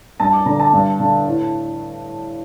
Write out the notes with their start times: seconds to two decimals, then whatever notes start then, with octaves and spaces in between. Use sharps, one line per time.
0.20 G2 A5
0.33 D6
0.46 D3 A#5
0.60 A5
0.73 G2
1.00 D3
1.26 A2